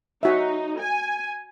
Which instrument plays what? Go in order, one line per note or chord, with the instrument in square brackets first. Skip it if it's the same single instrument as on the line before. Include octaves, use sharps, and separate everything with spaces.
[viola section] D#4 [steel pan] F#4 E5
[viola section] G#5